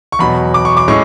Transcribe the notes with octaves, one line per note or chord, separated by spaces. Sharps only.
C#6
E2 B2 F#3 B5
D6
C#6
D6
A2 G#3 C#4 C#6